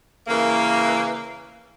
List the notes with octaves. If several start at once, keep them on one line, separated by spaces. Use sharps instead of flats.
C#3 E3 A#3